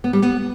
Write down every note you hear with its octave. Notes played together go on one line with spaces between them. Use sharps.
B3
G3
B3